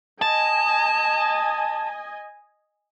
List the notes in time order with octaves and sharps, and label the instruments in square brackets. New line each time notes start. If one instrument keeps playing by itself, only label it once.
[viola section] D#5 G#5 [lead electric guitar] A5